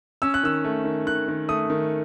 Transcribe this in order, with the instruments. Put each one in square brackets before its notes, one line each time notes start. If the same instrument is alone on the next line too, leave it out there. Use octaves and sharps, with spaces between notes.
[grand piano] C#4 E6
F#6
D#3 E6
A3
D#3
D#3 F#6
D#3
A3 D#6
D#3